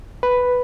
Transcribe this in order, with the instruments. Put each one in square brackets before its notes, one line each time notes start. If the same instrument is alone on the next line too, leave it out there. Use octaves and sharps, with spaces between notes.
[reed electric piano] B4